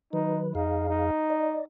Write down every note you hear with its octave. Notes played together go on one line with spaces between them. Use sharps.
D#3 F#3 D#4 B4
F2 D#4 G#4 F5
D#4
D5 D#5